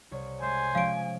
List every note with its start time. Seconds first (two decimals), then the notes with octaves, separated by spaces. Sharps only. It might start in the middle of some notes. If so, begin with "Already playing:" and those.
0.11 C2 C#5
0.42 G#3 C5 E5 G#5
0.75 F3 G#3 C#4 F5 D7